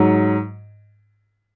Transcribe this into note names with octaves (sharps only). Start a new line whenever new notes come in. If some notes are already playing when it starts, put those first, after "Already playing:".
Already playing: G#2 F#3